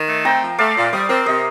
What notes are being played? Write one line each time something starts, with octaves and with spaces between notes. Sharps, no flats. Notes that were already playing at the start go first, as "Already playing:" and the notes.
Already playing: D#3
A3
C4 G5 A#5
F3
A3 D5 F5
A#2
G3 C5 D#5
C4 A#4 D5
C3 C5 D#5